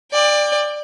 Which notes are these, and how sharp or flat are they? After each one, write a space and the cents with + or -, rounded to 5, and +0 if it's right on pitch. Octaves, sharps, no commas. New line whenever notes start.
D5 +15 G5 +35